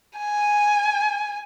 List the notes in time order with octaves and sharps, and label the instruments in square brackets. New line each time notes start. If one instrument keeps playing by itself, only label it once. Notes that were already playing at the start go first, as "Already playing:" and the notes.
[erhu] G#5